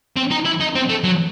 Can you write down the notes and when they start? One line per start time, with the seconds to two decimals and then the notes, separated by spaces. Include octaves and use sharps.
0.16 C4
0.31 D#4
0.45 E4
0.60 D#4
0.75 C4
0.89 A3
1.04 F#3